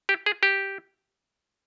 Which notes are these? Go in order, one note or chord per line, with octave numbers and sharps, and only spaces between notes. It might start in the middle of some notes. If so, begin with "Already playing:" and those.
G4
G#4
G4